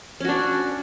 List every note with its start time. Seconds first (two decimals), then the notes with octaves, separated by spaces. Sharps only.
0.20 C#4
0.25 F#4
0.29 D4